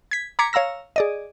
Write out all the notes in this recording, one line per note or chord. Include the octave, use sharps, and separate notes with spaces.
G#6 B6
A#5 D6 G#6 B6 C#7
C#5 F5 A#5 E6 A#6
G#4 D5 D#5